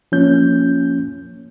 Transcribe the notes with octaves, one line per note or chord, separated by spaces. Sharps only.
F3 A#3 C#4 G6